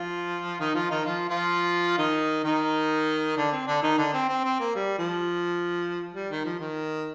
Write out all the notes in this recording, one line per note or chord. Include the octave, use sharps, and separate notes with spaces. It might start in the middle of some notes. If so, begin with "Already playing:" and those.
Already playing: F3 F4
D#3 D#4
F3 F4
D#3 D#4
F3 F4
F3 F4
D#3 D#4
D#3 D#4
D3 D4
C4
D3 D4
D#3 D#4
D3 D4
C4
C4
C4
A#3
G3
F3
G3
D#3
F3
D#3